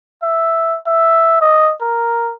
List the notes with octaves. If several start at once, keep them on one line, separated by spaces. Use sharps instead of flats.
E5
E5
D#5
A#4